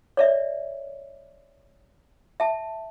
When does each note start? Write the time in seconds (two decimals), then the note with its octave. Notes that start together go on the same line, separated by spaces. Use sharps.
0.17 C#5 D5 E5
2.40 E5 A5